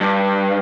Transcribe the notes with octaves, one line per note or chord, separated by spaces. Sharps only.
G2